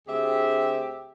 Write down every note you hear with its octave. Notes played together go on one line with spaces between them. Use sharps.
D2 C4 G4 G#4 E5